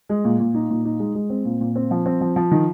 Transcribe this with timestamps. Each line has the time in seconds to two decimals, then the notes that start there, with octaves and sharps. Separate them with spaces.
0.09 G#3
0.24 A#2
0.39 A#2
0.54 D#4
0.70 A#2
0.85 D#4
1.00 G#3
1.15 G#3
1.30 C4
1.45 A#2
1.61 A#2
1.76 C4
1.91 F3
2.06 C4
2.21 F3
2.36 F3
2.51 D#3